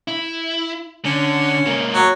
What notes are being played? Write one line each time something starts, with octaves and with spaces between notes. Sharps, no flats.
E4
D3 C#4
G#2 A#3
F#3